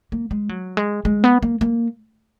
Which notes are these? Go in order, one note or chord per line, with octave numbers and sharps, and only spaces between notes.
A#3
G#3
F#3
G#3
G#3
B3
A#3
A#3